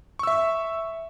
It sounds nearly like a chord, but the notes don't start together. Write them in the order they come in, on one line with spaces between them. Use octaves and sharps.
C#6 E6 E5